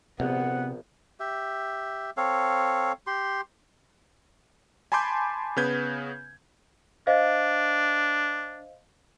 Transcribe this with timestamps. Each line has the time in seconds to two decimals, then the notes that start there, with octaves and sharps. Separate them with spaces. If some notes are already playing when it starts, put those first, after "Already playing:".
0.20 A#1 C3 B3 F#5
1.20 G4 E5
2.17 C4 A4 C#5 F5
3.07 G4 C6
4.92 G#5 A5 B5 C6 D6 G6
5.57 C#3 B3 B4 G6 G#6
7.07 D4 C5 D#5 F5